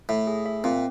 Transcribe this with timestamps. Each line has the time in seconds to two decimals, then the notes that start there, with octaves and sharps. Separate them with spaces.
0.09 A2 E5
0.27 G#4
0.46 E5
0.64 A#2 C4